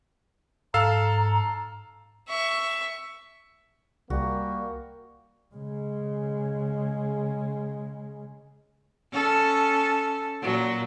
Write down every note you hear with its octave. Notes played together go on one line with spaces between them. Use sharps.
G#2 A4 F5 A#5 E6
E5 C#6
C2 G3 A#3 F#4
C#3 G#3
C#4 A4
A#2 F#3